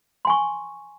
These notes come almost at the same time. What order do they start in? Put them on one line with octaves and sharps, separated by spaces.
C6 G#5 C#6